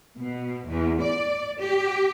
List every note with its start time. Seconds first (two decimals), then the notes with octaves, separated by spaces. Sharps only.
0.17 B2
0.68 E2
1.01 D5
1.60 G4